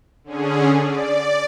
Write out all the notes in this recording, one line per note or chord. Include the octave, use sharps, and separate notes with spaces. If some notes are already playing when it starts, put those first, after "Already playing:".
D3 C#4 G#4
D5